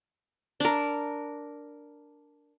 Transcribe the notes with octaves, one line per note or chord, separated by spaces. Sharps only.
D4 A#4